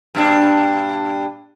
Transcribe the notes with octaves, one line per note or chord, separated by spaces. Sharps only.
G2 A#2 D4